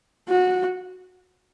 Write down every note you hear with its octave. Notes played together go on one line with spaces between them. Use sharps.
F#4